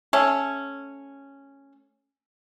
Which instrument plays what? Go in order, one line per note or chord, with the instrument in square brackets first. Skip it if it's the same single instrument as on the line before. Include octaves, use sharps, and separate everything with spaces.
[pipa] A3 C#4